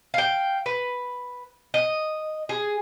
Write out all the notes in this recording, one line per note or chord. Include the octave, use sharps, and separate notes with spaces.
F5 G5
B4
D#5
G#4